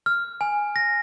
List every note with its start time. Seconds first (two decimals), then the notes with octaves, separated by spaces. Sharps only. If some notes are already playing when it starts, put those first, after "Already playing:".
0.06 F6
0.41 G#5
0.76 A#6